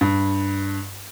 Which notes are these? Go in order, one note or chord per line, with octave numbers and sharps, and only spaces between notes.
G2